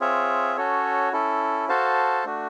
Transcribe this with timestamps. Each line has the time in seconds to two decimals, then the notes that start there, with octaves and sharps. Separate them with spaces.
0.01 C4 F4 G#4 C#5 E5
0.56 C#4 F#4 A4 C#5
1.13 C#4 E4 A4
1.68 F#4 A4 C5 F5 A5
2.25 A3 D4 F#4